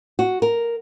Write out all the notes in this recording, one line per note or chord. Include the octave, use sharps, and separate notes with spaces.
F#4
A#4